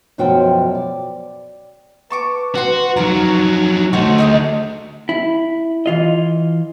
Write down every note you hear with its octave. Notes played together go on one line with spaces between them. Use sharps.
F#2 B2 F3 F#4 D5 G5
D5
B4 A5 C#6 D6
F#4 F#5 C6
F2 F#3 D#4 A#4 C#5
D2 A3 F#4 C5 C#5 D#5
D#4 E4 G#4
E4
E3 F4 D#5